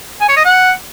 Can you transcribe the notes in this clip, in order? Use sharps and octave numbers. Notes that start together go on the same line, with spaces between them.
G#5
C#5
D#5
F#5